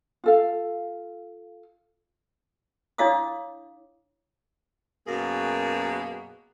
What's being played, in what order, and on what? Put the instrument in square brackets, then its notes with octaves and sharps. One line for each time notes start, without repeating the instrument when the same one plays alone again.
[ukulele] F4 A4 F5
[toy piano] D4 E4 C#5 F5 D6 D#6
[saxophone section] F#2 B2 A#3 G#4